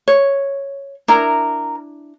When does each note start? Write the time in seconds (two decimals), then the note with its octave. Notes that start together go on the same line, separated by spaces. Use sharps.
0.08 C#5
1.08 D4 E4 A#4 A#5